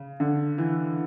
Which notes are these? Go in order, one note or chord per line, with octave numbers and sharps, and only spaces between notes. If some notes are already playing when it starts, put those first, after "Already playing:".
Already playing: C#3
D3
E3